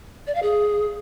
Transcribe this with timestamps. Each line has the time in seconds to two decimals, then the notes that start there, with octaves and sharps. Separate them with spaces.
0.27 D5
0.35 F5
0.43 G#4